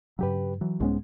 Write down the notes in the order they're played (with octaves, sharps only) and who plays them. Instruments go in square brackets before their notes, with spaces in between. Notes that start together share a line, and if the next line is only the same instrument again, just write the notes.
[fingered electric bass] G2 F#3 [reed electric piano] C#3 G4 B4
[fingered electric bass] E3 [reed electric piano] F#3
[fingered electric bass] C2 B3 C#4 [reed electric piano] G#2 G#3